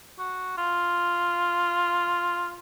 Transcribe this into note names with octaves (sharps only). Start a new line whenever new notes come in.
F#4
F4